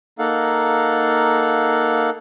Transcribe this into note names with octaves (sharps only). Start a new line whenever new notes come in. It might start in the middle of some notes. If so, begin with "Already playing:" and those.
A#3 D#4 A4 F5 F#5